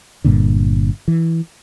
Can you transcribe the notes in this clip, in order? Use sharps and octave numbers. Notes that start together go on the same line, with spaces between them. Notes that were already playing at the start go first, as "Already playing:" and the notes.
G1 G2 A#2 D3
E3